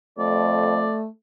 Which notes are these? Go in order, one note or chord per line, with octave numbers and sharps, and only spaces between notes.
F2 A3 D5